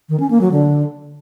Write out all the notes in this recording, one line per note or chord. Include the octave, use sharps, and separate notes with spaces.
D#3
C#4
A#3
F#3
D3